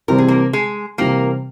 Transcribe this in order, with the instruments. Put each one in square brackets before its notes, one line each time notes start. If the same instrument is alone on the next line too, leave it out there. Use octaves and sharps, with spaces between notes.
[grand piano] C3 E3 G3 C4 [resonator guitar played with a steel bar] A#4
[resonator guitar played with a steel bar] G#4
A#3 A#4
G#3 G#4
[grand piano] C3 E3 G3 C4 [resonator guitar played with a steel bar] A#3 A#4